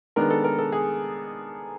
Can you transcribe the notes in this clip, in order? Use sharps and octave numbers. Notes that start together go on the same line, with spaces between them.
D#3 G#3 B3 D4 A#4
A4
A#4
A4
G#4